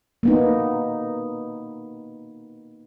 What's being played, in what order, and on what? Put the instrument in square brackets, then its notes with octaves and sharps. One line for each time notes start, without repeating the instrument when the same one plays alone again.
[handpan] A#3 B3 D#4